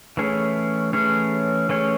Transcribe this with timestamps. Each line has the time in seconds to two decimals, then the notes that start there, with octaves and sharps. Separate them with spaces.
0.17 E3 A3 C#4 G#4 C#5
0.93 E3 A3 C#4 G#4 C#5
1.69 E3 A3 C#4 G#4 C#5